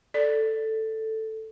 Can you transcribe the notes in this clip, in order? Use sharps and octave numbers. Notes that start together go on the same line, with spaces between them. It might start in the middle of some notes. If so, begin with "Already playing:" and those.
A4 D5